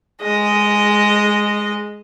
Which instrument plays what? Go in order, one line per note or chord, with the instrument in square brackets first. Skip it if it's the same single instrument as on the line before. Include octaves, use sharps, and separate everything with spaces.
[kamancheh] G#3 D#5